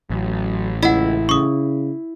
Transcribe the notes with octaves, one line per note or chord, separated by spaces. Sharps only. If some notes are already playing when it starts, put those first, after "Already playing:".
A1 F#3
C#2 E4 D#5 F#5
C#3 C#6 D#6